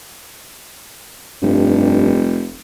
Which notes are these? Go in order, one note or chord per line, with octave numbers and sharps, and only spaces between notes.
F1 G2